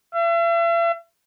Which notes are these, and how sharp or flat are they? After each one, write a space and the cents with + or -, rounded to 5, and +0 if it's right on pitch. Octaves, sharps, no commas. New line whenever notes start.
E5 +45